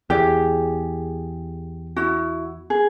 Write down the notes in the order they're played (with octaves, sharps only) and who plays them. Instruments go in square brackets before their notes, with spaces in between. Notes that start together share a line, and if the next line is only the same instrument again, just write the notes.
[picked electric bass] E2 [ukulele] G4 G#4 D5
[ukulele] E4 F#4
G#4